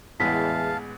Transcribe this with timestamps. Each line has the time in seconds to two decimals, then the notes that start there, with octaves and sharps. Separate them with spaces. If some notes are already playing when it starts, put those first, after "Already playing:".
0.20 A1 E2 G#3 B3 F5 A5 B6